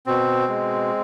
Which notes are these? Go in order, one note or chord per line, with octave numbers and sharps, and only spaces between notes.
B2 C4
G#3